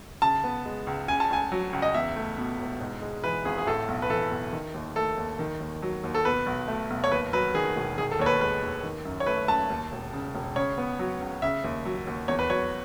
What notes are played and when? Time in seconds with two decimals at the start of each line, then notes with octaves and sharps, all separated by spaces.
0.22 C#3 A5
0.44 B3
0.65 G#3
0.87 C#2
1.08 C#3 G#5
1.20 A5
1.30 C#2 G#5
1.52 F#3
1.73 C#2
1.82 D#5
1.94 E2 E5
2.16 A3
2.38 B2
2.59 E1
2.81 G#2
3.02 G#3
3.24 E3 B4
3.45 G#1 G#4
3.58 G#4
3.67 A2 A4
3.88 B1
4.02 B4
4.10 E3 A4
4.31 B1
4.53 D#3
4.74 D#2
4.96 A3 A4
5.17 D#2
5.39 D#3
5.60 D#2
5.82 F#3
6.04 D#2
6.15 A4
6.25 B2 B4
6.46 B1
6.68 A3
6.90 B1
7.04 C#5
7.12 D#2 B4
7.33 F#3 B4
7.54 D#3 G#4
7.76 E1
7.98 D#3 G#4
8.11 A4
8.19 D#2 C#5
8.26 B4
8.40 G#3 B4
8.62 D#2
8.83 D#3
9.05 F#2
9.20 C#5
9.26 A3 B4
9.48 F#2 A5
9.70 D#2
9.92 E1
10.13 C#3
10.35 E1
10.56 C#3 C#5
10.78 B3
10.99 F#3
11.21 C#2
11.42 C#3 E5
11.64 D#2
11.85 F#3
12.07 D#2
12.28 E2 C#5
12.39 B4
12.49 F#3 C#5